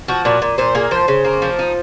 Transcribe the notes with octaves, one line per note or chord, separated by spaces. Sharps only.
F3 F#4
A#2 F#4
A#2
A#2 C5
A#3 G#4
F3 C5
C#3
A#3
F3
D#4